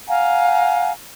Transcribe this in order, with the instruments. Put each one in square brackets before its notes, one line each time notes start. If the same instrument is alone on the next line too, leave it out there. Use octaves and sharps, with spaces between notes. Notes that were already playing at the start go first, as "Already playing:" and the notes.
[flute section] F5 F#5 G#5 A#5